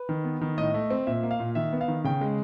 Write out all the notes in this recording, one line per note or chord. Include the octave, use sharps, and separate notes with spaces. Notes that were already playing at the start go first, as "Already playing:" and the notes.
Already playing: B4
D#3
B3
D#3
A2 D#5
A3
C4
A#2 E5
A#3
F5
A#2
D#3 E5
B3
F5
D#3
C#3 G5
G#3